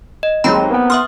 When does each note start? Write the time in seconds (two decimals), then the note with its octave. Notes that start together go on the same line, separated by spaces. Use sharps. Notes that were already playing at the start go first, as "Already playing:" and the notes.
0.23 D#5
0.44 D#2 F#3 G#3 C4 A#5 B5
0.70 A#3 B3 G5
0.90 E5 C6 D#6 F6